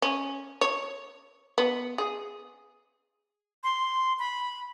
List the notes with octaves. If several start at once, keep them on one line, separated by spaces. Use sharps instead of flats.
C#4
C#5
B3
G#4
C6
B5